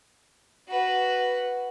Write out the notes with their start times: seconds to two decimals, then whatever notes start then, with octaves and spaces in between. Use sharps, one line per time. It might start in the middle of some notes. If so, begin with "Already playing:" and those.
0.68 F#4 B4